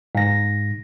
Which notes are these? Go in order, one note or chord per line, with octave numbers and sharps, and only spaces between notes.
G#2 A#6